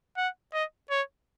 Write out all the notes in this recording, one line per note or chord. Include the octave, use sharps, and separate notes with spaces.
F#5
D#5
C#5